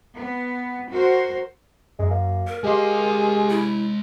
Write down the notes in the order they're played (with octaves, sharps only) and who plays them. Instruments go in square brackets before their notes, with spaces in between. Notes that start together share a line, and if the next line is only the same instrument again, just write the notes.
[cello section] B3
F#4 A#4 C5
[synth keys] F#2 [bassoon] G#3
[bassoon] A#3
[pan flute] A#4
[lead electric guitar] G#3 F5 [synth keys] G4 D#5 C6 [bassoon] G#4
[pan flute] E4